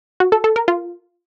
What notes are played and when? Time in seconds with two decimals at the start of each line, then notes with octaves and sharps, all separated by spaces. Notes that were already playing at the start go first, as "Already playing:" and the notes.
0.20 F#4
0.32 A4
0.44 A4
0.56 A#4
0.68 F4